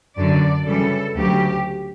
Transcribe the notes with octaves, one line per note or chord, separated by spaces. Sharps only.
F#2 D3 F#3 D5
F#2 C#3 E3 G3 A4
D2 C#3 F#3 G4